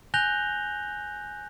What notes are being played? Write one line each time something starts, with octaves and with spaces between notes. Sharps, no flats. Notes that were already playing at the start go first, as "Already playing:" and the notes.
G#5 F#6 G6 A#6 F7 G7